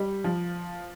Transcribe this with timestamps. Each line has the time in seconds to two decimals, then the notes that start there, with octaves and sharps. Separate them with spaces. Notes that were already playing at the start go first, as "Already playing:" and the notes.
Already playing: G3
0.24 F3